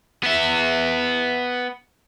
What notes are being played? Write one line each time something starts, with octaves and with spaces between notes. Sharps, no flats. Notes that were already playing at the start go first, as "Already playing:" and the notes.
B3 E5